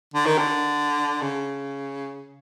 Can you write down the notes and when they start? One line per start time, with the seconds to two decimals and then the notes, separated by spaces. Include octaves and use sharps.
0.14 D3
0.26 D#3
0.38 D3
1.21 C#3